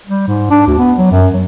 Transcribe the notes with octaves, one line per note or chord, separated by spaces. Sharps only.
G3
G#2
D4
D2
B3
F#3
F#2
F#3